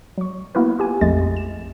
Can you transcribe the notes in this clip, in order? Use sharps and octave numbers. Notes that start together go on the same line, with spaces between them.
F#3 C#6
A#3 B3 E4 F#4 A#4 B4
F4 G4 G#5
A#1 F2 G#3 A3 D#5 A6
E7